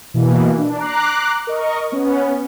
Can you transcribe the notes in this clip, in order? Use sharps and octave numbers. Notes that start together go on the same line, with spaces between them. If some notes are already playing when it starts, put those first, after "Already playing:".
B2 E3 A#3
D4
A#5 D6 F#6 C7
A#4 D#5 C#6
B3 C#4